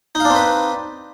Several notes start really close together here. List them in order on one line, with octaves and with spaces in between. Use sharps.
D#4 F5 D4 C4 B4